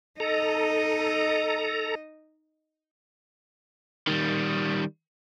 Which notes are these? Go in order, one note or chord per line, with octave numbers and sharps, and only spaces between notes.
D#4 A4 D#5 A#5
D#3 G3